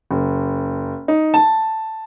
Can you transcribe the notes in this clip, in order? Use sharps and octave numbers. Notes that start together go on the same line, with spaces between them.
F#1
D#4
A5